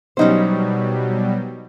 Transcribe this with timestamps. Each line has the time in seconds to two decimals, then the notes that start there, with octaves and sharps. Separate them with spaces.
0.17 B2 F#3 G3 C#4 D#4 C5